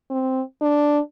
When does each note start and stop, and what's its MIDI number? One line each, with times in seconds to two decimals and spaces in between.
0.10 0.42 60
0.61 0.99 62